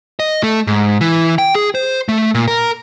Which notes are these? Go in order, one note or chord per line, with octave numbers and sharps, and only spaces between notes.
D#5
A3
G#2
E3
G5
G#4
C5
A3
A#2
A#4